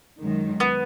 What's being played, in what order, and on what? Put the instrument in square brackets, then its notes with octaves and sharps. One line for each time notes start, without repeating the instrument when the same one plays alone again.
[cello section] F#2 D#3 G#3
[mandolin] B3